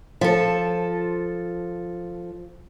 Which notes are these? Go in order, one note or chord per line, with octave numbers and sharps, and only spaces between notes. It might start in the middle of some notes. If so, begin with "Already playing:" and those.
F3 A4